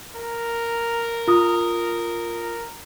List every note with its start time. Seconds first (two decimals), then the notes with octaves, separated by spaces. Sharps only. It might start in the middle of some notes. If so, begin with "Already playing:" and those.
0.16 A#4
1.28 F4 D#6